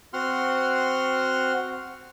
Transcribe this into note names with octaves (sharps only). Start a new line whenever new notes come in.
C4 F#4 F#5 C6 F6